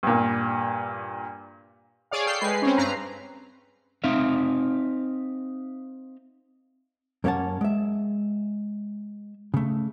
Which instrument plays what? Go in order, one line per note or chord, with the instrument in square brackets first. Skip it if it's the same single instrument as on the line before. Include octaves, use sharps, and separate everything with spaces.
[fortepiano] G2 A#2
[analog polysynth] G#4 C#5 D5 F5
A4 G5 C7
G#3 B4 C7
C4 C#4
G2 B4 A#5 C7
[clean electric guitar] C4 D#4 E5 F5
[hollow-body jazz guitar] F#2 A#3 C#4 C#5 F#5 A5
G#3 E5
C#3 A3